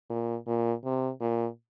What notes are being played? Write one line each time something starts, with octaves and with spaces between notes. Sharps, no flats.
A#2
A#2
C3
A#2